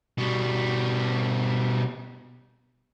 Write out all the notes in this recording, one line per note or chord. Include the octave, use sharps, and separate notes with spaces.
B2 G3